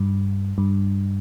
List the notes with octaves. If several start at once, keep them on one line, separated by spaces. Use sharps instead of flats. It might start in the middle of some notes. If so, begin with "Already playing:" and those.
Already playing: G2
G2